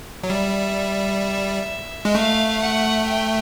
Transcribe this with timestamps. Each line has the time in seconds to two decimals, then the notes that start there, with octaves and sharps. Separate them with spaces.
0.23 F#3
0.29 G3 E5
2.05 G#3
2.15 A3 F5
2.61 F#5
3.08 G5